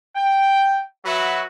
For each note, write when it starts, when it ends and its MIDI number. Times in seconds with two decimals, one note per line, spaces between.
0.16 0.81 79
1.05 1.43 54
1.05 1.43 66
1.05 1.43 71
1.05 1.43 76